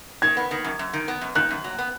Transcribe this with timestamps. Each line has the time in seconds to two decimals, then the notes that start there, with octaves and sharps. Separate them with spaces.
0.22 D#3 G#6
0.37 B3
0.51 D#3
0.64 F#2
0.79 F#2
0.93 D#3
1.08 B3
1.21 F#2
1.35 D#3 F#6
1.51 F#2
1.64 F#3
1.79 B3